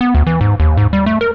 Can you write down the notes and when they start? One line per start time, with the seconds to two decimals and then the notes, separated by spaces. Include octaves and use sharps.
0.01 B3
0.15 D2
0.27 E3
0.41 G#2
0.60 D#2
0.77 G#2
0.93 G3
1.06 A3
1.21 A#4